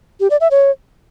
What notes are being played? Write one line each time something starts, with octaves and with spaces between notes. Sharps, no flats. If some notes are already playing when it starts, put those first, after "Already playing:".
G4
D5
E5
C#5